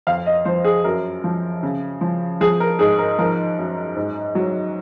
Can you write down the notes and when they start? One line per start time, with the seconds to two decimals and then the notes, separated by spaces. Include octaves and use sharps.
0.07 F2 F5
0.26 D#5
0.45 F3 C5
0.64 G#4
0.84 F#2 A#4
1.24 F3
1.63 C#3
2.01 F3
2.41 F3 G#4
2.60 A#4
2.79 G#2 G#4
2.99 A#4
3.19 F3 A#4
3.58 F#2
3.96 G#2
4.35 F#3